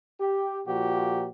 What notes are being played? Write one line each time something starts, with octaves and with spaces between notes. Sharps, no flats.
G4
A#2 F3 F#4 G4